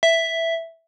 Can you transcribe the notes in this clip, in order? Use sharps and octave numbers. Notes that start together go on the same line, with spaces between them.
E5